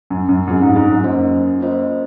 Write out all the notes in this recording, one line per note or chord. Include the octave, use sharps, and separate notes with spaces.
F#2
F#2
F#2 C4 F4 G#4
G#2
G#2
F#2
A#3 C#4 F4 C5 D#5
A#3 C#4 F4 C5 D#5